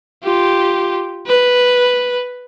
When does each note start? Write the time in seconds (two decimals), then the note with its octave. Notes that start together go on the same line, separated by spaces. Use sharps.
0.23 F4 G4
1.27 B4